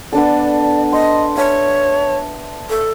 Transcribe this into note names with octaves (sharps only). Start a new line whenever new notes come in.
B3 D4 A4 D5
D#5 C6
C#5 E5 A5
A4